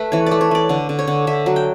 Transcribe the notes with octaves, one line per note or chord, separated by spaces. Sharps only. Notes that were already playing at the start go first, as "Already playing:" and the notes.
Already playing: A3 A4 B4
E3 C#5
A3 D5
C#5
E3 D5
D3 C#5
D3
C#5
D3
D3 E5
F#3
G5